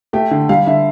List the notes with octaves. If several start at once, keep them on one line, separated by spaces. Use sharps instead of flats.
A3 G4
D3
G3 F5
D3 E5